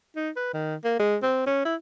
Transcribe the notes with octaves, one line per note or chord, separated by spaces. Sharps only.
D#4
B4
D#3
A#3
G#3
C4
C#4
E4